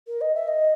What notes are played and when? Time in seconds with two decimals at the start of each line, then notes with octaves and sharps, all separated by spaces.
0.07 A#4
0.21 D#5
0.34 E5
0.48 D#5